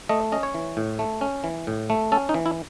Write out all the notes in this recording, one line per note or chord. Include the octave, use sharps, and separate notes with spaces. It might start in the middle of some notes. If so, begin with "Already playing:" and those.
A3 D#5
C#4 D#5
C#5
E3
A2
A3
C#4
E3
A2
A3
C#4 A4
D#4
E3
E4